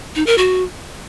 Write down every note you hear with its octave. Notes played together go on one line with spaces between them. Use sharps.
D#4
A#4
F#4